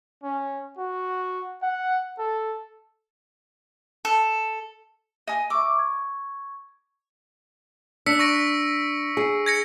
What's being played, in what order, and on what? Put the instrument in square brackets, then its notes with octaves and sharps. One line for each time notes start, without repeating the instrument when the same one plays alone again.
[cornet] C#4
F#4
F#5
A4
[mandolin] A4
[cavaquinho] D#5 G#5
[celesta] E5 C#6 E6 [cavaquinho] D6
[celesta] C#6 G#6
[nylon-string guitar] D4 [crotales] E6 B6 C#7
[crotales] C#6 A#6 D7
[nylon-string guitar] G#4
[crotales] G#6 A#6 C#7